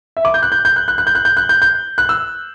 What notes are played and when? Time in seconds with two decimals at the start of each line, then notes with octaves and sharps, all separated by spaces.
0.17 E5
0.25 D6
0.34 G6
0.43 F#6
0.52 G6
0.65 G6
0.76 F#6
0.88 F#6
0.98 F#6
1.07 G6
1.15 F#6
1.25 G6
1.37 F#6
1.49 G6
1.62 G6
1.98 F#6
2.09 E6